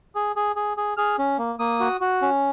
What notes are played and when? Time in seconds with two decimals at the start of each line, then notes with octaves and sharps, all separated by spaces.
0.15 G#4
0.36 G#4
0.56 G#4
0.77 G#4
0.97 G#4 F6
1.19 C#4
1.38 A#3
1.59 A#3 D#6
1.80 F#4
2.01 F#4
2.22 C#4